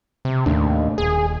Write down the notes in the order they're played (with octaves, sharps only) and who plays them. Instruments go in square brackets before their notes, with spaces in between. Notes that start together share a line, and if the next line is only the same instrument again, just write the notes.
[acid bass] C3
[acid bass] D#2 [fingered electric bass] A2 A3 D4
[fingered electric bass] D#1 D#2 [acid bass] G#4